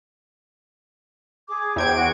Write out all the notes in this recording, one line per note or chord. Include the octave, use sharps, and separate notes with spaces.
G#4 D6
E2 C5 G5 G#6 D7
F#4 F#5